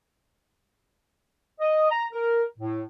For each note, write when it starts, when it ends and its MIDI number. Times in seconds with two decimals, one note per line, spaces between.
1.60 1.88 75
1.91 2.05 82
2.12 2.42 70
2.58 2.83 45